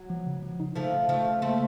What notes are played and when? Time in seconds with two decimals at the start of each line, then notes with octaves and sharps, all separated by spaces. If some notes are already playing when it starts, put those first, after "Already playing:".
Already playing: F#3
0.10 F3
0.27 C#3
0.43 F3
0.60 D#4
0.76 C#3 F3 A3
0.92 C#3
1.09 C#3 F3 A3
1.25 C#3
1.42 A3 A#3 C4